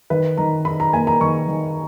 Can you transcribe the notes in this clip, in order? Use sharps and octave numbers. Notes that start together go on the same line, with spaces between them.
D#3 B4
D#3 A#5
D#4 B5
A#5
A#3 G#5
A#5
D#3 C#6
D#3